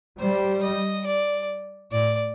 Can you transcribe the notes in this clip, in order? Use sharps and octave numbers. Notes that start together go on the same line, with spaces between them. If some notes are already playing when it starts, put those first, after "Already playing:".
G3 C5
D#5
D5
A2 D5